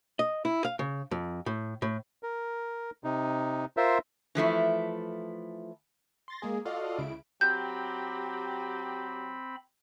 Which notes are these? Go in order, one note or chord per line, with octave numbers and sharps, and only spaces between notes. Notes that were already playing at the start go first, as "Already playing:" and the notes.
D#5
E4
F5
C#3
F2
A2
A2
A#4
C3 D#4
F4 A#4 C5 E5
E3 F3 A3 E4
C6 A6 A#6
G#3 A#3 G#4
F4 F#4 A4 D5 D#5 F5
C#2 C#3 E4 D7
F#3 C4 G4 B5 G6